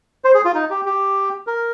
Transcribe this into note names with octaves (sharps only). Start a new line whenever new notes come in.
C5
G#4
F4
D#4
G4
G4
A#4